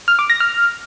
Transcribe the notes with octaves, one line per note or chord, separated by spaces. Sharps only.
F6
D6
A#6
F6